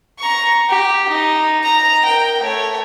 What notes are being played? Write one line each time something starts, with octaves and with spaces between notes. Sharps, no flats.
A#5 C#6
G4
D#4
A#5
A#4 G5
A3 C#5